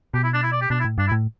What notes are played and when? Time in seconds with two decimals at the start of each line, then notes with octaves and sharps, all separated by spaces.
0.14 B2 G4
0.24 E4
0.33 D4
0.43 E4
0.52 D5
0.61 G4
0.70 B2 D4
0.80 E4
0.85 A2
0.98 G2 D4
1.07 E4
1.12 A2